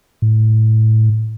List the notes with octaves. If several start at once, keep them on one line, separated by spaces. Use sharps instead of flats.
A2